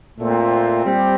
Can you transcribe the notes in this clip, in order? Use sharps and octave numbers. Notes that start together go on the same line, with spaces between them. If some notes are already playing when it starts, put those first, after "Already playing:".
A#2 A3 C4
G3 C4 G4